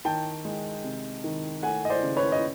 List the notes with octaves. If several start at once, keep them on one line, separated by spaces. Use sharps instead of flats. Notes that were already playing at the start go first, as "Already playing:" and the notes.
D#3 G5 A5
G#3
C3
D#3
A3 F#5 G#5
D#5
C5 D5
C#3
B4 C#5
D#5